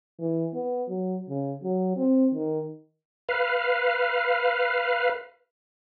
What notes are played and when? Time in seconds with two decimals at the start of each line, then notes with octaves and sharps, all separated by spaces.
0.19 E3
0.54 B3
0.89 F#3
1.29 C#3
1.63 F#3
1.96 C4
2.34 D#3
3.29 B4 F5